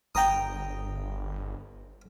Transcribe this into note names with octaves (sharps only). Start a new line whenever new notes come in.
G1 G5 A#5 D#6